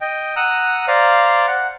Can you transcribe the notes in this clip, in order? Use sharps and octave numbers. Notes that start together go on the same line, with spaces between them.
D#5 G5
F#5 A#5 D#6 E6 F#6
C5 D5 F5 A#5
F#5